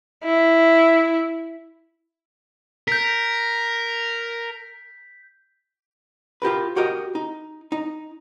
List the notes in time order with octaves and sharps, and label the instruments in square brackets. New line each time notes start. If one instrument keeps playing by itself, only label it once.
[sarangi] E4
[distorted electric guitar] A#4 [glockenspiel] G6 B6
[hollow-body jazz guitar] F4 G4 A#4 B4
F#4 G4 A#4 D#5
D#4
D#4